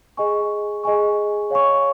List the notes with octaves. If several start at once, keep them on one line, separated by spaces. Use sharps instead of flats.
G#4 D#5 G#5 C#6
G#4 D#5 G#5 C#6
C#5 F5 G#5 C#6